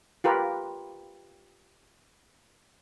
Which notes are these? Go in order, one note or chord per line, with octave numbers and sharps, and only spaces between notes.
F4 G4 A#4 B4